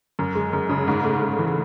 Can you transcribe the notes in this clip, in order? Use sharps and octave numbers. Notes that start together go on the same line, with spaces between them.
F#2
G#3
F#2
C#3
G#2
A3
G#2
E3